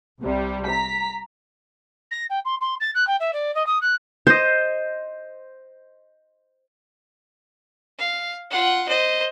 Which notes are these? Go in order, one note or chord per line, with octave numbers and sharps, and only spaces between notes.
C2 C3 G3
A#5 B6
A#6
G5
C6
C6
A6
F#6
G5
E5
D5
D#5
D#6
F#6
C5 D#5
F5
F4 F#5
C5 D#5